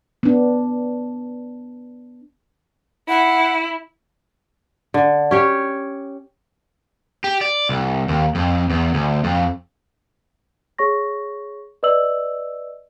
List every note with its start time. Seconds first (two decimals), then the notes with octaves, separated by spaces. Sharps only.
0.23 B3 D4
3.09 E4 F#5
4.94 D3
5.31 C#4 G4 C#5
7.24 G4
7.41 D5
7.69 C2
8.08 D#2
8.35 F2
8.70 E2
8.94 D2
9.24 F2
10.78 G#4 C#5 C#6 A#6
11.83 B4 D5 D#5 E6 F#7